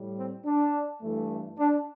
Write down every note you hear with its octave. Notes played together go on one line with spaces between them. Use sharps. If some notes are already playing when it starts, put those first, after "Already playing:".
Already playing: A2 G3
C4
D4
G2 E3 A3
D4